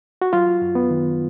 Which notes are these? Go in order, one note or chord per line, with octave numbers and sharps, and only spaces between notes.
F#4
F#3 F4
F#2
B3
D#3